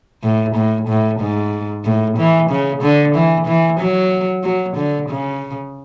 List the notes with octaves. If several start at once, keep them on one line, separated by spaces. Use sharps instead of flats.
A2
A2
A2
G#2
A2
E3
C#3
D3
E3
E3
F#3
F#3
D3
C#3